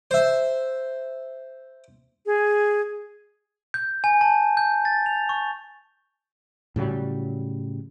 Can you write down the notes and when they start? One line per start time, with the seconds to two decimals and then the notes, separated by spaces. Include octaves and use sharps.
0.11 C5 E5
2.26 G#4
3.74 G6
4.04 G#5
4.21 A5
4.57 G6
4.85 A6
5.06 F7
5.29 C#6
6.76 A2 C#3 F#3 G3